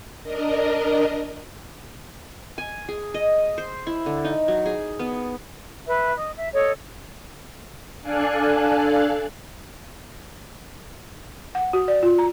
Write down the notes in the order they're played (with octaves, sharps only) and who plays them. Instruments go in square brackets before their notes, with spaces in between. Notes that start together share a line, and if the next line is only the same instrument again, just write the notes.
[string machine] D4 A#4 D#5
[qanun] G#5
G#4
D#5
C5
E4
D3
D#4
F#3
G#4
B3
[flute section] B4 E5
D#5
E5
A4 C#5 D#5
[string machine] D4 A4 D5 F5 G#5 F#6
[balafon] F#5
F#4
D5
F4
A#5